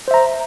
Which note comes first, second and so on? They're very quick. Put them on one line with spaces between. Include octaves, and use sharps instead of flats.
C5 E5 A#5